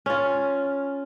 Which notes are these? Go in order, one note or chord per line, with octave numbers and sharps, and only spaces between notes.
C#4 F4